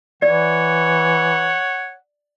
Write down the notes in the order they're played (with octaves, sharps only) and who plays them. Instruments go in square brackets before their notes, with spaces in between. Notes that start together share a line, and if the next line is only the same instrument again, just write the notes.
[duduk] E3 [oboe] C#5 [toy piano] D5 [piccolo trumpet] F#5